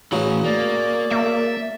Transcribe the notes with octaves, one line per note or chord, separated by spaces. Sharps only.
A2 C#3 E3 F#3
A#3 D5
A#3 E5